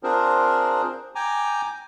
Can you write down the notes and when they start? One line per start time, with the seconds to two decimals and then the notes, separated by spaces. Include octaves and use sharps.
0.03 C4 D4 F4 G#4 A#4 C5
1.15 G5 G#5 A#5 D6